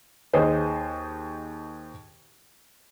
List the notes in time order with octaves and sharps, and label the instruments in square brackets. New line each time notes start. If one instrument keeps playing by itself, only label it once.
[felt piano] D#2 G#4 C5 D#5